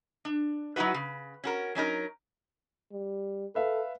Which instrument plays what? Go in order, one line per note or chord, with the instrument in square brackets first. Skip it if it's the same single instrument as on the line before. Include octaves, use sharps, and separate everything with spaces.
[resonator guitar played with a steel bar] D4
F#3 D#4 E4 F#4 B4
C#3
C#4 F#4 A#4
F#3 C#4 D#4 A#4
[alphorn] G3
[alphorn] A4 [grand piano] B4 E5 F5